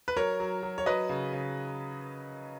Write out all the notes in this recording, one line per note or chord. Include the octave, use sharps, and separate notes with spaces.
B4
F#3 A#4 C#5
F#3
F#3
C#5
F#3 B4 D#5
C#3
C#3